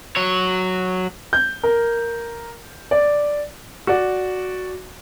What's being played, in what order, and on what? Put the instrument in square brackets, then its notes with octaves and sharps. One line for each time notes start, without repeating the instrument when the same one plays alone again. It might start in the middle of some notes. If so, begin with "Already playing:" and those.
[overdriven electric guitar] F#3 C#5
[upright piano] G6
A#4
D5
[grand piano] F#4 D5